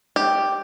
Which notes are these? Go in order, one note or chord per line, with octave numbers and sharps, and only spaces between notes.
G4